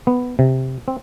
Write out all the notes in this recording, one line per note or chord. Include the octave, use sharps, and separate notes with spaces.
B3
C3
C4